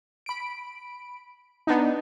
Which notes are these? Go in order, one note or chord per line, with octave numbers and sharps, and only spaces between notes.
B5 D7
B3 D4 D#4